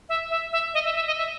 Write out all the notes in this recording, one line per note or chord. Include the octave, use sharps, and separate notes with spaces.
E5
E5
E5
D#5
E5
E5
D#5
E5